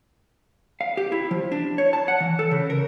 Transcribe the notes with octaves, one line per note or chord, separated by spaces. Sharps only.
F5
G4
E4
F3
D4
C#5
A5
F#5
E3
A4
C#3
A#4